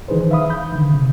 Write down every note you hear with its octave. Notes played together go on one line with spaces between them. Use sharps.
D#3 E3 D#4 G#4 B4 C5
D#3 E5 F5 B5 D#6
B5 G6
D3 D#3
C3